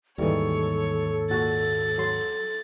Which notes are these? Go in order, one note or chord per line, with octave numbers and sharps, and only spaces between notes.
D#2 G#2 D#3 E3 G3 A4 C#5
A#2 F#4 A6
F#3 C6